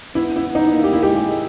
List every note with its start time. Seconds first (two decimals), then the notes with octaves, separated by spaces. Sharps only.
0.15 B3 E4
0.36 E4
0.55 D#4
0.74 A#3
0.83 G4
0.93 E4
1.03 G#3 G4